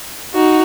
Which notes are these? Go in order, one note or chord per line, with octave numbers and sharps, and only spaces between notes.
D#4 F#4